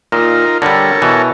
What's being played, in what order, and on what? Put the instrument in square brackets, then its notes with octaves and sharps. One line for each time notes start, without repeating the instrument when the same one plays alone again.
[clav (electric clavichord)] A#2 [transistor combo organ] D#4 F4 A#4
[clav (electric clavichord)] D3 G3 [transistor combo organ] A4 A#4 C#5
[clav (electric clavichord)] B2 E3